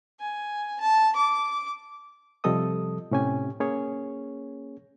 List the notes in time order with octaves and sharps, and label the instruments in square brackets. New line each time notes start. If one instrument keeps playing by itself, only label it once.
[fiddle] G#5
A5
D6
[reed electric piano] C3 F3 G3 A4 D#5 D#6
A2 C3 C#4 G4 G#5
A#3 C#4 G#4 C#5